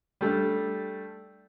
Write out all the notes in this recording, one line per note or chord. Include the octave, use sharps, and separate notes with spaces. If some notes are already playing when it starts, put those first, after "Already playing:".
G3 A3 D4